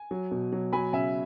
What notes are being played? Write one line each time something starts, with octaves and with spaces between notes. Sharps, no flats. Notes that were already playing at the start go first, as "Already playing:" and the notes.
Already playing: G#5
F#3
B2
F#3
F#3 G#5 B5
C#3 E5 G#5